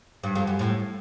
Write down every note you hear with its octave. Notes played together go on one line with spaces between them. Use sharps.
G2
F2
F#2
A2